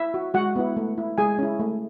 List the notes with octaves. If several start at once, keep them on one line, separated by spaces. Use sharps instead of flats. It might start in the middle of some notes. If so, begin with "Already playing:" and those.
Already playing: E4 E5
F#4
G#3 F#4 F#5
B3 E4
A3
E4
G#3 G#4 G#5
C#4 E4
A3